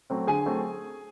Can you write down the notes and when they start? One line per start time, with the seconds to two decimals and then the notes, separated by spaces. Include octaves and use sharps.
0.10 F#3 A3 C4
0.27 D3 G#4 G#5
0.46 F#3 A3 C4